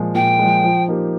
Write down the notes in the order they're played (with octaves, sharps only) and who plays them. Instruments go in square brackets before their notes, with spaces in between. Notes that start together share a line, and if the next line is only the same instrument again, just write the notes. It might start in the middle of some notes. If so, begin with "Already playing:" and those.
Already playing: [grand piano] A#2 F3 G#3
[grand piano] A#2 [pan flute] G5
[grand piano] F3 G#3
F3
A#3 D#4 G4